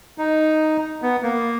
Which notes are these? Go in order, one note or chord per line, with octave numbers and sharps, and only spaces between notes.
D#4
B3
A#3